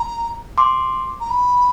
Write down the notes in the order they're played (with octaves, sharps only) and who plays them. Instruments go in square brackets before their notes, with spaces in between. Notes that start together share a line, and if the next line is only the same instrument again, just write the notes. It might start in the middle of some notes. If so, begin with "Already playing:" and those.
Already playing: [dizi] A#5
[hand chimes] C6 D6
[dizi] A#5
B5